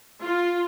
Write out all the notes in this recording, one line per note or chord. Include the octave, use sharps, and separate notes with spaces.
F4